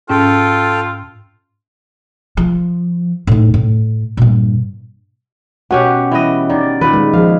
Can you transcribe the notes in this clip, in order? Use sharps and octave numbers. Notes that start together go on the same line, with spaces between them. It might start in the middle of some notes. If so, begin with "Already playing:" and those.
G#2 C#4 F4 A4 G5
F3
A2 D#4
A2
G2 A#2
B2 C#4 G4 F#5
E3 G3 D#5
D#3 D5
A#2 D#3 B4
G#3
F3 G#4 F5